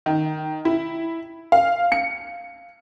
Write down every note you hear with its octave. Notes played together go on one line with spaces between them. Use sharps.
D#3
E4
F5
C#7